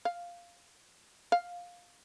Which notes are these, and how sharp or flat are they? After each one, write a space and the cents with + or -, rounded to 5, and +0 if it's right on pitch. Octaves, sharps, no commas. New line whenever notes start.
F5 -5
F5 +15